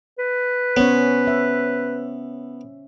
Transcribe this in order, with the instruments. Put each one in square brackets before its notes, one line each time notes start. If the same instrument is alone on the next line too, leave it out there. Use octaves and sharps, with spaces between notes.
[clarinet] B4
[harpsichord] B3 [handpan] C#4 C5 C#5
[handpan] E5